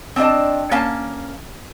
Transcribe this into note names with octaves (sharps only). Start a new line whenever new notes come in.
C4 D4 D5 D#5 A5
A#3 C#4 F5 A5